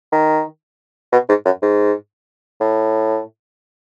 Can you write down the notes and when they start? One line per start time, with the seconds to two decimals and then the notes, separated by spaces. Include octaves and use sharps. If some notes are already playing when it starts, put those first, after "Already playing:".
0.13 D#3
1.12 B2
1.29 G#2
1.45 F#2
1.62 G#2
2.61 A2